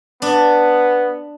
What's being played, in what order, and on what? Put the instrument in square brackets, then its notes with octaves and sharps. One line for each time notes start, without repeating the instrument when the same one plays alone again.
[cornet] B3 [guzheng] D4